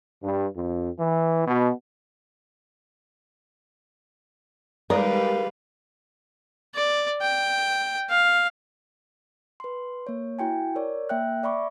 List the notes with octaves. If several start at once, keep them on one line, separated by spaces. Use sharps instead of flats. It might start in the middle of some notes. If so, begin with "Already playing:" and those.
G2
F2
E3
B2
D#3 G3 G#3 A#4 B4 D5 F5
D5
G5
F5
B4 C6
A#3 C#5
E4 F#4 G5 G#5
A#4 C#5 D5
A#3 E5 G5 F#6
D5 E5 B5 C#6 D6